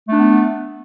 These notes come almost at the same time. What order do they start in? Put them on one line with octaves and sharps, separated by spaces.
A3 D4 B3